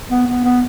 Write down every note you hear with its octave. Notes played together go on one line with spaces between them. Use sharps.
B3
B3
B3